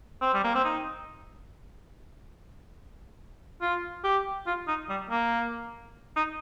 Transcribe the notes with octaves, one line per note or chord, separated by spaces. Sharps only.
C4
G3
A#3
C4
D#4
F4
G4
F4
D#4
G3
A#3
D#4